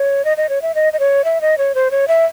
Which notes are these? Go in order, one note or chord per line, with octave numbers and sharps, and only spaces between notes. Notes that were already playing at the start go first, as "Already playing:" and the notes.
Already playing: C#5
D#5
D#5
C#5
E5
D#5
D#5
C#5
E5
D#5
C#5
C5
C#5
E5